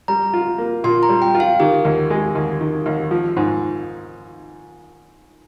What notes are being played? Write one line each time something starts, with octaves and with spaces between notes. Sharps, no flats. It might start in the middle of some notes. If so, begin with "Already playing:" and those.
G3 A#5
F4
A#3
A#2 C6
A#5
G3
G5
F4
F5
D#3 G4
D#2
G#3
D#2
D#3
D#2
F3
G#2